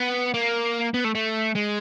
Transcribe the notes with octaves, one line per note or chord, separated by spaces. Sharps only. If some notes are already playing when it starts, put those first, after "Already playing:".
Already playing: B3
A#3
B3
A3
A3
G#3